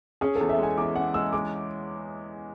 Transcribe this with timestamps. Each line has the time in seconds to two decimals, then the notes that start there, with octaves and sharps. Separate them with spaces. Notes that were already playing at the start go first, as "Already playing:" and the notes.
0.21 C#4 G#4
0.36 A4
0.41 E2
0.49 E5
0.58 G#3 G#5
0.78 E2 D6
0.96 C#4 F#5
1.14 G#3 E6
1.33 G#3 D6